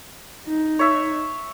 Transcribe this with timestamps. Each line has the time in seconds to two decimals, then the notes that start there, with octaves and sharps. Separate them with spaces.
0.47 D#4
0.79 C#5 E5